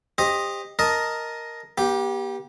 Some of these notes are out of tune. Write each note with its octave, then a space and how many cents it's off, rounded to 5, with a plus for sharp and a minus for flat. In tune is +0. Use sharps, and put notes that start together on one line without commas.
G4 +25 C5 +20 D#5 +0
A#4 +0 D#5 +5 A5 -10
B3 -45 G4 +0